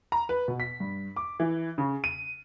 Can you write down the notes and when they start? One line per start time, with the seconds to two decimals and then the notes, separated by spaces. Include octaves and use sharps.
0.12 A#5
0.29 B4
0.48 B2
0.60 B6
0.80 G2
1.16 D6
1.40 E3
1.78 C#3
2.04 D#7